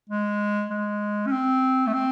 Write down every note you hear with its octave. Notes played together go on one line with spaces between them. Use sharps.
G#3
G#3
C#4
C4
A3
C4